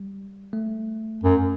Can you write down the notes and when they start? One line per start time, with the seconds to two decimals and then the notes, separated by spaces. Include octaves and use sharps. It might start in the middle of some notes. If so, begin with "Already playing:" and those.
Already playing: G3
0.53 A3
1.24 F#2